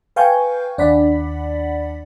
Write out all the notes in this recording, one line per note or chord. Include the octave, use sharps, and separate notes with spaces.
B4 F5 G5 G#5 C#6 G6
D#2 D4 D5 F#5 B5 B6